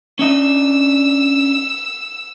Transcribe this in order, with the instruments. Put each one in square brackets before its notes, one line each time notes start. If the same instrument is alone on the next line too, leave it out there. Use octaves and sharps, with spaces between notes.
[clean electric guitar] C#4 D4 D#5 [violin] E6